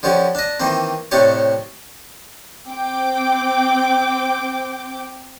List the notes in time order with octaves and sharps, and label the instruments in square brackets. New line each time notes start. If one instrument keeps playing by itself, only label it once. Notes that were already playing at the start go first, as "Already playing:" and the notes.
[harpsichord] D3 F3 C#4 G4
D4 D#5
D#3 E3 A#3 C4
A2 C3 A3 D4 G4 C#5
[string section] C4 G5 D6